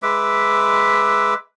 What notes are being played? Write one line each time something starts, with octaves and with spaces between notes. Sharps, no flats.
G#3 B4 E5 D6